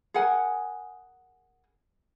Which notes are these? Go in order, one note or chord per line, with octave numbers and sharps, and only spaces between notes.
G#4 A#4 F#5 G#5